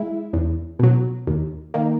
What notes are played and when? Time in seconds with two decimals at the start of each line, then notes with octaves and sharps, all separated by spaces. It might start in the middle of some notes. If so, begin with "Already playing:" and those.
Already playing: G#3 E4
0.33 E2
0.79 B2 F#3
1.27 D#2
1.74 D#3 A#3